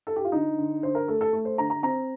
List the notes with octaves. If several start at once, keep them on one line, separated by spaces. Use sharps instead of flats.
A4
G4
F4
D3 D#4
D3
D3 C5
A#4
A3 A4
A4
A3
C5
D3 A#5
A#5
C4 A#5